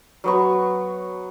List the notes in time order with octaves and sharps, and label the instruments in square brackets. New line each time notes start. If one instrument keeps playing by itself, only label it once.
[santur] F#3 B3 C#6